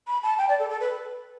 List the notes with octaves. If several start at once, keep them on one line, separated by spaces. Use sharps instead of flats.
B5
A5
G5
D5
A4
A4
B4